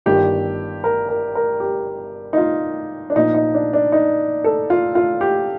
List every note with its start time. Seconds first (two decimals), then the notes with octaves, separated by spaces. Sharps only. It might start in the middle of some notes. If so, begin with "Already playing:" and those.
0.06 G1 G2 D#3 G4
0.84 A#4
1.09 A#4
1.35 A#4
1.60 G4
2.33 D#4
2.38 F4
3.10 D4
3.15 A#1 A#2 F3 D#4
3.34 D#4
3.54 D4
3.73 D4
3.92 D#4
4.44 A4
4.70 F4
4.95 F4
5.21 G4